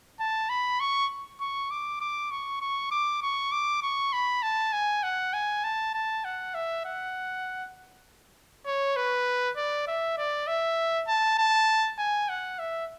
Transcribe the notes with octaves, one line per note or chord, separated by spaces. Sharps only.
A5
B5
C#6
C#6
D6
D6
C#6
C#6
D6
C#6
D6
C#6
B5
A5
G#5
F#5
G#5
A5
A5
F#5
E5
F#5
C#5
B4
D5
E5
D5
E5
A5
A5
G#5
F#5
E5